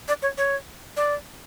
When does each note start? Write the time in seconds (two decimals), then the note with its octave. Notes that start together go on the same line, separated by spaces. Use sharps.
0.08 D5
0.22 C#5
0.38 C#5
0.97 D5